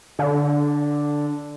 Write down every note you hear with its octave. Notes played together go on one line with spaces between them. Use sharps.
D3